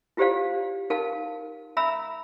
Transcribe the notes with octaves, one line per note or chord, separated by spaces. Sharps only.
E4 F4 G4 C5 D5 F5
D#4 A#4 F5 A5
E5 A#5 B5 E6